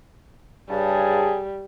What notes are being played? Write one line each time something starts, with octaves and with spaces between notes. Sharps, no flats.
G2 C#3 G3 G#4 A5